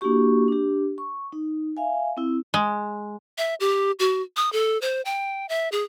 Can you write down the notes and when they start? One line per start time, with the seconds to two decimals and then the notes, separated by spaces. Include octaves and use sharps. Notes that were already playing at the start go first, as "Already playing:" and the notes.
0.01 A#3 D4 E4 F#4 G4 C#6
0.48 D4 G4
0.98 C#6
1.32 D#4
1.77 E5 F5 G#5
2.17 C4 E4
2.54 G#3
3.38 E5
3.60 G4
3.99 F#4
4.37 D#6
4.52 A4
4.82 C5
5.05 G5
5.49 E5
5.72 G#4